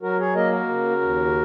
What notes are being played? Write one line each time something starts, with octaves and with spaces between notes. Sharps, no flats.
F#3 F#4 A#4
G#4 C#5
A#3 A#4 D#5
F#4 A#4
C#3
D#2